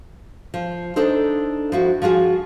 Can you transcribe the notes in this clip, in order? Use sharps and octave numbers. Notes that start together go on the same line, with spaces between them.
F3
D4 D#4 A4 C5
F3 E4 F#4
F3 F4 F#4 G#4